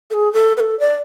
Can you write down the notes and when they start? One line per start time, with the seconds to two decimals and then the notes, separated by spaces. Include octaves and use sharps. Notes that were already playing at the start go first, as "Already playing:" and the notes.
0.11 A4
0.14 G#4
0.33 A4
0.57 B4
0.60 A4
0.80 D5